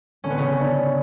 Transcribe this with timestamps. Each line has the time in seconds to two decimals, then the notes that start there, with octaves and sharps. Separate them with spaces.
0.24 D3 C#4
0.31 B3
0.38 C#3 C#4
0.60 D4